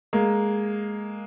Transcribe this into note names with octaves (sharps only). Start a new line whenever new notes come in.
G#3 A#3